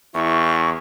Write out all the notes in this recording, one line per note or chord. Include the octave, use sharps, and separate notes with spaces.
E2 E4 C#6